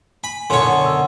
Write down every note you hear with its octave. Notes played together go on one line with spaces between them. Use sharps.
G#5 B5
F#2 B2 D3 C#5 C6
E6